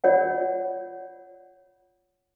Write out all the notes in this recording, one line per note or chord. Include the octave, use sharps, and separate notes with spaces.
F4 C#5 D5 F#5